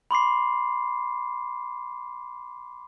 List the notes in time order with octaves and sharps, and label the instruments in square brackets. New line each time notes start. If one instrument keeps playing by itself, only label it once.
[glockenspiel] B5 C6 D6 C7